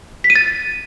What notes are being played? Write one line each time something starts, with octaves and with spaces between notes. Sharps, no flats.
B6
D#7
A6